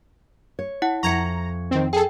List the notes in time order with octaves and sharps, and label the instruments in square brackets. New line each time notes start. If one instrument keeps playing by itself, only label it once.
[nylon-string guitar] C#5
[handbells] E4 F#5
[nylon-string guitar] F2 E5 [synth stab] A#5 [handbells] C#6 G#6 C#7
[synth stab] D#3 C4
[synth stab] G#4 A4 [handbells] G5